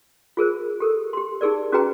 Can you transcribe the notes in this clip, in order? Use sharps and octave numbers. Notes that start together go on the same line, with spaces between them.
F4 G#4 A#4 C5
G4 A4 A#4
G4 C6
D#4 G4 G#4 A#4 D5
C#4 F#4 G#4 B4 G5 A#5